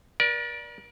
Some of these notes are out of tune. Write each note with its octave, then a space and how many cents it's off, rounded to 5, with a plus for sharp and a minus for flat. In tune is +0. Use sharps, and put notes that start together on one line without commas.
A#4 +45 D5 +0